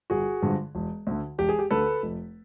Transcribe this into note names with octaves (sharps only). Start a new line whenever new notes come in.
G1 F#4 G#4
G2 D3 F3 G#3
E1
D2 D3
E1 G4
G#4
G4
D2 D3 A4 B4
F1